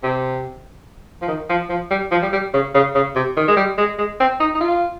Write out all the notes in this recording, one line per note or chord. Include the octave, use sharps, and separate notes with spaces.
C3
F3
D#3
F3
F3
G3
F3
G3
G3
C#3
C#3
C#3
C3
D#3
G#3
G3
G#3
G#3
C4
D#4
D#4
F4